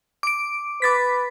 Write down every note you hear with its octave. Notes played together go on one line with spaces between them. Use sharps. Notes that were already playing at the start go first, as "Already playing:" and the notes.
D6 D7
B4 D6 A6 B6